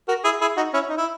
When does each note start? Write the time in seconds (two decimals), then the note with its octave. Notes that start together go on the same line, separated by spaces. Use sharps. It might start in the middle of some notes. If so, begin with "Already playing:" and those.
0.08 F#4 A#4
0.24 E4 G#4
0.41 E4 G#4
0.57 D#4 F#4
0.74 C#4 E4
0.89 D#4
0.98 E4